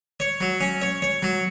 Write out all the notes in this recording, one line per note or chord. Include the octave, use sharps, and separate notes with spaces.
C#5
F#3
C#4
C#5
C#5
F#3